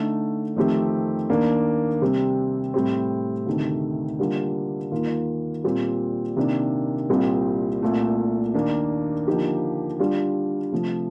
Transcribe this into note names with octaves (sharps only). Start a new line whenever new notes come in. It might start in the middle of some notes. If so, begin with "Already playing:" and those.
Already playing: D3 A3 D#4
F2 D#3 A3 C4 G4
D#2 D#3 A#3 D4
C3 G3 C4
A2 G3 C4
D2 C3 D#3 A3
D3 G3 A#3 F4
D#2 D#3 A#3 F4
A#2 G3 C4 G4
C3 D#3 A#3 D4
C2 A#2 G3 C4
C2 A#2 A3
D#2 D#3 A#3 D4
D3 F3 A#3 D#4 G4
D3 G3 D4 F4
C3 F3 A3